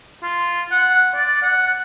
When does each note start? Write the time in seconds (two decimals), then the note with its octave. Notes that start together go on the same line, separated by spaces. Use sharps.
0.23 F4
0.72 F#5
1.15 D5
1.42 F#5